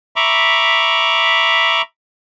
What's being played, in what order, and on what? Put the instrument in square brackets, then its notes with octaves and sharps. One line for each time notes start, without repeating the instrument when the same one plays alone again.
[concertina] E5 A#5 B5 C#6 D6